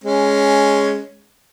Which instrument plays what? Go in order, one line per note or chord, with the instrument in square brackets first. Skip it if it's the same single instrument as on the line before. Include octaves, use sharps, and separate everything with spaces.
[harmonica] G#3 C#4